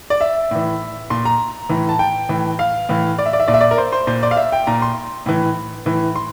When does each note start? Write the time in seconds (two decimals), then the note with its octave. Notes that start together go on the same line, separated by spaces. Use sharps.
0.10 D5
0.21 E5
0.51 A2 E3
1.10 A#2 C6
1.25 A#5
1.69 A2 E3
1.89 A5
1.99 G5
2.29 A2 E3
2.59 F5
2.89 A2 E3
3.18 D5
3.26 E5
3.33 D5
3.40 E5
3.48 A#2 D5
3.54 E5
3.61 D5
3.71 A#4
3.78 C5
3.93 C5
4.07 A#2 C5
4.23 D5
4.31 F5
4.37 E5
4.52 G5
4.67 A#2 A#5
4.82 C6
5.26 A2 E3
5.86 A2 E3
6.16 C6